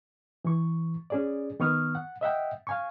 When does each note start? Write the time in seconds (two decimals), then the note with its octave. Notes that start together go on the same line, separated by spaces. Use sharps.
0.45 E3 C#6
1.10 C#4 G#4 D5
1.60 D#3 B3 C#6 D#6 F6
1.95 F#5
2.21 D#5 E5 F#5 G5
2.67 F5 G#5 C#6